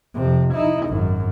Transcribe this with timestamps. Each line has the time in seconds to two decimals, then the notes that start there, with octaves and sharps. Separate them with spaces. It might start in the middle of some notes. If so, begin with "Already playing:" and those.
0.15 F2 C3
0.54 D#4 E4
0.88 G#1 F#2